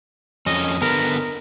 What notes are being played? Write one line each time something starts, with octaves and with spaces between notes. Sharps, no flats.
F2 C#4 D#5
D3 B3 A#4